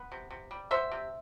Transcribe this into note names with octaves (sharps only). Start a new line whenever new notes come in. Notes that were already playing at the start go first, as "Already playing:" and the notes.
Already playing: B3
C3
C3
G3
B3 C5 E5
C3